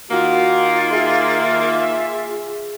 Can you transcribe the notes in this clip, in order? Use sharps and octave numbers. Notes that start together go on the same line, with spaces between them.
D#3 A#3 F4 F#4
G#4 E5